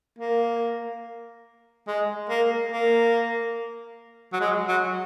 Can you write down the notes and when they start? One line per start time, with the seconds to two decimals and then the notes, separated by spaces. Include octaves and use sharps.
0.19 A#3
1.87 G#3
2.29 A#3
2.72 A#3
4.33 F#3
4.41 G#3
4.68 F#3